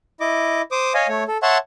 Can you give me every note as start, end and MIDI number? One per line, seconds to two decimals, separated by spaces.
0.20 0.62 64
0.20 0.62 75
0.20 0.62 86
0.72 0.93 72
0.72 0.93 86
0.72 0.93 87
0.94 1.07 73
0.94 1.07 75
0.94 1.07 77
0.94 1.07 80
1.08 1.24 57
1.08 1.24 73
1.28 1.38 69
1.43 1.58 73
1.43 1.58 76
1.43 1.58 78
1.43 1.58 81
1.43 1.58 84
1.43 1.58 85